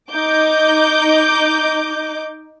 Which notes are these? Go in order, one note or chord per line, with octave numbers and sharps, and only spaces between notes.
D#4 D6 G6